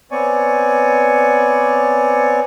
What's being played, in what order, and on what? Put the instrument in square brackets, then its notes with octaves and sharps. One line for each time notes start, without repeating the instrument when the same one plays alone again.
[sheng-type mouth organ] B3 C4 C#5 D5 G#5 C#6